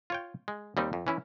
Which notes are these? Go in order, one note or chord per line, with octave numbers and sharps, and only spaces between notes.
F4 C#5 G5
G#3
D#2 G3 C4 D#4
F2
E3 C#4 E4